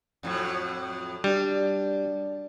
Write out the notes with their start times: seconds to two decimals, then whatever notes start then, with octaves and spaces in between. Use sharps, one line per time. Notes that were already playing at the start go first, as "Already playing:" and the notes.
0.23 F2 A2 F#3
1.24 G3 D4